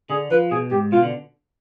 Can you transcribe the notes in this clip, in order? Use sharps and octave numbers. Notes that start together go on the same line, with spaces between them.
D3 G#4
F3 B4
B2 G#4
G#2 G4
B2 F4
D3